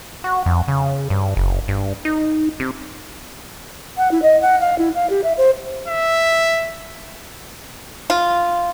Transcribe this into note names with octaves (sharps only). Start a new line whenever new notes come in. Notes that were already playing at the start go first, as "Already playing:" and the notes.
F#4
F2
C#3
G2
F#1
G2
D#4
C3
F#5
E4
D#5
F#5
F5
E4
F5
G4
E5
C5
E5
F4